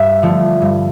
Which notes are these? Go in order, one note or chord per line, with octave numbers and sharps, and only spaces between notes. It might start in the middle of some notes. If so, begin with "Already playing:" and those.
Already playing: G2 E5
D3 F3 A3
G2